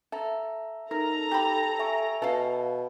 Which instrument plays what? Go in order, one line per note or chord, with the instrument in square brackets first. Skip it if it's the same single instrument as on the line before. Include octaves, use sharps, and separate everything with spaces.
[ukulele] A4 [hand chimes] E5 A#5
[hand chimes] D#4 [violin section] A4 A#5 [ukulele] A#4
[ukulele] G4 B5
[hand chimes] E5 G#5 C#6
[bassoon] B2 [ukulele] A4 F5